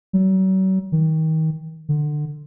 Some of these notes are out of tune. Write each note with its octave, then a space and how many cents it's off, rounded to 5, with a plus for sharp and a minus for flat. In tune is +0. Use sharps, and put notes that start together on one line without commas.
F#3 +40
D#3 +30
D3 +25